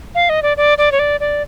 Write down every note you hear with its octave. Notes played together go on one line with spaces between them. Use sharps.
F5
D#5
D5
D5
D5
C#5
D5
D5